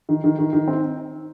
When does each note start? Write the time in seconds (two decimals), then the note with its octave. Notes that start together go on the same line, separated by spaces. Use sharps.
0.09 D#3
0.24 D#3
0.39 D#3
0.53 D#3
0.68 C4